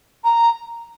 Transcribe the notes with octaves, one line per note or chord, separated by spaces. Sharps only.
A#5